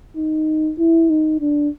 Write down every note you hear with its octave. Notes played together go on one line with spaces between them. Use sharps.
D#4
E4
D#4
D4